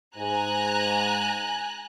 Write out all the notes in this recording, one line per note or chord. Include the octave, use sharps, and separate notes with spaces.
G#2 G#5 A#5 F#6